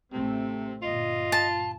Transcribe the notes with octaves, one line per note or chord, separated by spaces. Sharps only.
A1 C3 A3 C4
G1 A#2 F4 D#5
A5